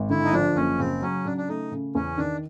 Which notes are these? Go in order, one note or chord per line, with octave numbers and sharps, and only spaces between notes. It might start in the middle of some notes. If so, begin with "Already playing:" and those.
Already playing: G#1
D3 E4
D#4
F3 D4
F#1 C#4
C#3 C4
F#3 C#4
C#3 D4
D4
A3 D#4
C#3
E2 C#4
D#3 D4